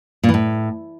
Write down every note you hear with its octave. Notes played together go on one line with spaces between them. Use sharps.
A#2
E3
A2